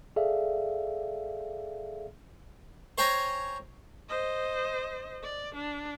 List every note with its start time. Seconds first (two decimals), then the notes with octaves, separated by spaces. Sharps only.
0.16 G#4 A4 D5 E5 F5
2.98 C5 C#5 G5 G#5 A#5
4.09 C5 D#5
5.23 D5
5.55 D4